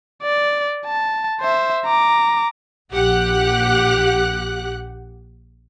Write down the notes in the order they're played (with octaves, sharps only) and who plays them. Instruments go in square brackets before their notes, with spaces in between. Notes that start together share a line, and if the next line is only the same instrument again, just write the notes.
[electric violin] D5
A5
C5 E5
A#5 D6
[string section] A#1 G4 F#5 F#6